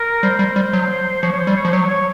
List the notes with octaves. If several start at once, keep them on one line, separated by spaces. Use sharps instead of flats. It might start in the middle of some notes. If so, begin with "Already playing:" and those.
Already playing: A#4
G3 C5
G3
G3
F#3
F3 C#5
C#5
C5
G3
C#5
F3 C5
F#3 C#5
C#5